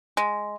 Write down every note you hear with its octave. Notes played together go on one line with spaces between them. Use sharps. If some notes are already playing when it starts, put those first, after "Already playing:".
G#3